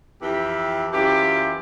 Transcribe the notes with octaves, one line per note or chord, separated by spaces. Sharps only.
F2 E3 G4
F#2 E3 F4 G4